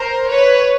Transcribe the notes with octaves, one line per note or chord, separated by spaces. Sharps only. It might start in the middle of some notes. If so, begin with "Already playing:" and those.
Already playing: A#4 C5
B4 C#5